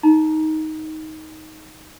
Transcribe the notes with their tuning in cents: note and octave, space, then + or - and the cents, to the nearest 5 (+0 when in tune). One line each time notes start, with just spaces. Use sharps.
D#4 +10 A#5 +20